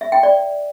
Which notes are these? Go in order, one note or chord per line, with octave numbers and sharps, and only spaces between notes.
E5
G5
D5